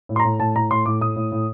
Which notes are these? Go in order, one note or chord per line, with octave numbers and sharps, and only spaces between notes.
A2
C6
A#5
A2
A2 A5
A2 A#5
A2 C6
A2 D6
A2 D#6
A2
A2